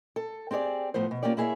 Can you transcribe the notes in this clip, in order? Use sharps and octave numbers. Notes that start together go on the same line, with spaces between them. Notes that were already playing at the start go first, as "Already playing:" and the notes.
A4
C4 G4 G#4 C#5 D5
A2 F3 B3 C5
B2
A#3 C#4 F4 G4 D5
A#3 E4 G#4 C5 C#5 E5